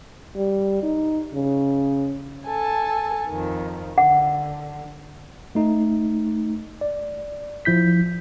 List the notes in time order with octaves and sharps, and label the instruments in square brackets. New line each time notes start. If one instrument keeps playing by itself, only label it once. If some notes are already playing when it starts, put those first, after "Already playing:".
[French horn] G3
D#4
C#3
[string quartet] A4 G#5 A5
F2 D#3
[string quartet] D3 [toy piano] F#5
[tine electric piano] A3 D#4
D5
F3 E4 G6 B6